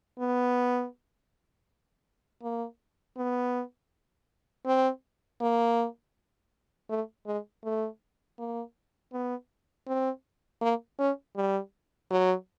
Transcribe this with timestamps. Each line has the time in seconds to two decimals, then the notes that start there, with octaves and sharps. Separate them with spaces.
0.19 B3
2.42 A#3
3.17 B3
4.66 C4
5.41 A#3
6.90 A3
7.26 G#3
7.64 A3
8.39 A#3
9.13 B3
9.87 C4
10.61 A#3
10.99 C#4
11.36 G3
12.11 F#3